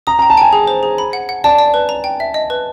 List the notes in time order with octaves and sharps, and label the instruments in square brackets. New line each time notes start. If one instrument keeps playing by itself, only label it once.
[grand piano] A#5 [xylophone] D#6
[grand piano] A#5
[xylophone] G5
[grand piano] A5
[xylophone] G5 [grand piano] G#5
[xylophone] G#4
C5
G#4
B5
F#5
F#5
[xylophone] D5 [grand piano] A5
[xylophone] D5
B4
A#5
G5
E5
D#5
B4